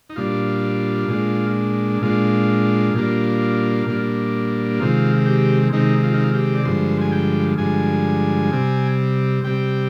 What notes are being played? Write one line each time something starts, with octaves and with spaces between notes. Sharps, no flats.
D#4
A#2 G3 D4 F4
A#2 G#3 D4
A#2 G#3 D4 F4
A#2 G3 A#3 D4
A#2 G3 A#3 D4
C3 D#3 G#3 C4 F4
G4
C3 D#3 G#3 C4 D#4
F4
D#4
F4
G4
D5
G2 D3 F3 G#3 C5
G#5
G5
G2 D3 F3 G#3 G#5
C3 G3 C4
C3 G3 C4 G5